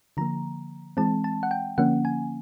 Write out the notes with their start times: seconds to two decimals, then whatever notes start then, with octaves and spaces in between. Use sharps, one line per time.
0.17 D3 F3 A#3 A#5
0.97 E3 G#3 C4 A5
1.24 A5
1.43 F#5
1.51 G5
1.78 D3 F3 A#3 C#4 F#5
2.05 G#5